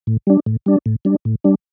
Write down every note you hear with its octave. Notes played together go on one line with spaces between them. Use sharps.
A2
G3 D4
A2
G3 D4
A2
G3 D4
A2
G3 D4